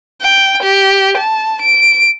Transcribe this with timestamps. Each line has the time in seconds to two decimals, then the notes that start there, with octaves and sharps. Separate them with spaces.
0.22 G5
0.63 G4
1.18 A5
1.62 D7